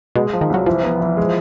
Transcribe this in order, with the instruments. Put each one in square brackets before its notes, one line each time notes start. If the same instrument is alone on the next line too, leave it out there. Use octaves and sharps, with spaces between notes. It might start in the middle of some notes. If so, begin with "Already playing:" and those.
[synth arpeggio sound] B2 [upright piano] G#3
[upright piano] F3
[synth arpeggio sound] D#3
[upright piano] C2 [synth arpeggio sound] F#3
[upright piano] E3 [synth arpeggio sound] F3
[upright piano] B3
E3
G#3